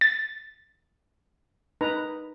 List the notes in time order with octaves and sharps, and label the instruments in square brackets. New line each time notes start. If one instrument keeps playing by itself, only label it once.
[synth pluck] A6
[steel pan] D#4 B4 A#5